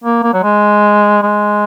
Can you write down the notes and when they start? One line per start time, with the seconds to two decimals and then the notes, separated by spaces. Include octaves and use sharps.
0.04 A#3
0.23 A#3
0.34 F#3
0.43 G#3
1.22 G#3